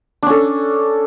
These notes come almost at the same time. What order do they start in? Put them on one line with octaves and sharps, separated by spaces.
D4 C#4 A4